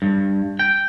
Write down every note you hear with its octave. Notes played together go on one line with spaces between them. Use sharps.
G2
G5